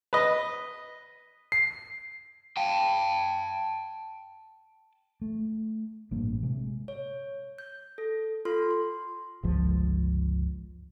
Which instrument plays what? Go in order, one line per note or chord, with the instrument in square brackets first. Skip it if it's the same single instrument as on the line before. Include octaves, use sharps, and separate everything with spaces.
[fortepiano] B4 D#5
[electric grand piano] C7
[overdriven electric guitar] G5 A5
[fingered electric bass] A3
A1 G2 A#2 A#3
C3 G#3
[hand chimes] C#5
G6
A4
F4 A4 C6 F6
C6
[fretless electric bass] G1 C#2 F3